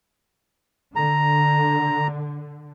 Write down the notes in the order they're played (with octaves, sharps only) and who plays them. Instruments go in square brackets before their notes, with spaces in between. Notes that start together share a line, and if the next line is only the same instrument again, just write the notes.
[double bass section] D3 [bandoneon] A#5